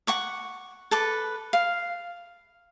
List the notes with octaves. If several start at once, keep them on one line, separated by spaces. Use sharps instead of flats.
F#5 C#6 D6
A4 B4 D6
F5